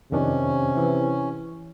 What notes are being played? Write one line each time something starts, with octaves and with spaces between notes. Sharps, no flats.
F2 C3 D#3 C#4 D4
E3